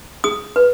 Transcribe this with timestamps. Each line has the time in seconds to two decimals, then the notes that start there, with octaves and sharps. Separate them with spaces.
0.24 G#4 D#6
0.56 B4